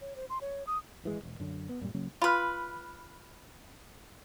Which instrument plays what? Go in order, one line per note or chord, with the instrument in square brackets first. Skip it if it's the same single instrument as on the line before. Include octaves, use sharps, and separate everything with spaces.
[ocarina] C#5
C5
C6
C#5
D#6
[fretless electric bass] G#1 E3 G#3
E1 D#2
F#2 D3
B3
F#2 A#2 G3
C#3 F#3 A#3 C#4
[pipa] F4 B4 [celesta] B5 F6